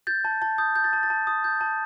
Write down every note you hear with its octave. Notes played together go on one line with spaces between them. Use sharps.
G6 A6
A5
A5
D#6 G6
G6
A6
A5 G6
A6
A5
D#6
G6
A5